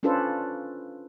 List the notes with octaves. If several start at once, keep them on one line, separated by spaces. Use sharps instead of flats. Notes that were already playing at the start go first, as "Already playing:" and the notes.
C#4 D4 F4 A4 B4 C5